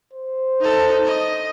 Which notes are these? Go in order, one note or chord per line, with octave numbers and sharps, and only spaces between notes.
C5
D#4 A4
D#5